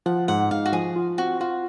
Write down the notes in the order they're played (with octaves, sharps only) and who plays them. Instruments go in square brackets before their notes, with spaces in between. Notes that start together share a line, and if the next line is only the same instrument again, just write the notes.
[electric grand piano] F3 [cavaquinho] F#5
[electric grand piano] G#2 [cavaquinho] F#5
[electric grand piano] G#2 [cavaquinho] F5
[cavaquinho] F#4
[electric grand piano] F3 [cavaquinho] G#4
[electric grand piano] F4
[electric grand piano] C4 [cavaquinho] F#4
[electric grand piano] F4 [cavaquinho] F#4